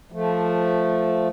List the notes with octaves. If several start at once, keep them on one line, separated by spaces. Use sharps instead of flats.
F3 A3